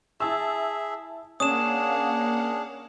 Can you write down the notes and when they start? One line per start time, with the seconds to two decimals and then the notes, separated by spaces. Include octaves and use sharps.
0.20 E4 G#4 E5 A5 E6
1.40 A#3 C#4 D4 G#4 F5 F#5 D#6 E7